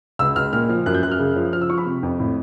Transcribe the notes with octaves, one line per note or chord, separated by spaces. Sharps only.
C#2 E6
C#2 F6
A#2 F6
F3
F#2 F#6
G6
F#2 F#6
F6
C#3
F3
F3 F6
E6
F3 C#6
B5
C3
F2
A2